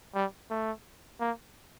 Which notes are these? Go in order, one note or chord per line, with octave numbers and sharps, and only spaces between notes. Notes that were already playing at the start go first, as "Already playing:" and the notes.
G3
A3
A#3